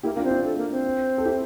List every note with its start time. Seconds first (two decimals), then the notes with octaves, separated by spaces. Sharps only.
0.03 A#3 E4 G4
0.15 A#3 D4 F4
0.24 C4
0.30 D4 F4
0.44 A4
0.57 A#3
0.71 C4
1.18 A4
1.25 E4 G4